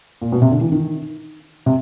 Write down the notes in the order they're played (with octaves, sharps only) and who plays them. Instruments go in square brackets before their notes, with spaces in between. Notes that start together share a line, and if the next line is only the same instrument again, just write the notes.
[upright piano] A#2
B2
C3
D3
E3
D#3
C3